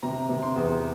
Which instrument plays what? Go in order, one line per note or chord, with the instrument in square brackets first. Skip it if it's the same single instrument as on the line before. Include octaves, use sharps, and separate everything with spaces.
[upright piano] C3 A#5
C3
C6
E2